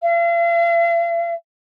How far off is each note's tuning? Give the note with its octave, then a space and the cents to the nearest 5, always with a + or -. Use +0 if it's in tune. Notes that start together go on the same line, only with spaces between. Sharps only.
F5 -45